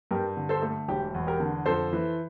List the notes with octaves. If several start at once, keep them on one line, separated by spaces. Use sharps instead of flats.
G2 G4 A#4
D3
A4 C5
A3
E1 G4
E2
G4 A#4
D3
F2 A4 C5
E3